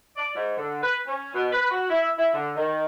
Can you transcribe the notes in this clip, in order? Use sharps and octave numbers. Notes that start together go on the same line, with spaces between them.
D5
G#2
D3
B4
C#4
B2
B4
F#4
E4
E4
D3
D#3